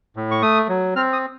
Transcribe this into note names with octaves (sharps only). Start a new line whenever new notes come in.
A2
C#6
A3 D#6
F#3
C4 F6
D#6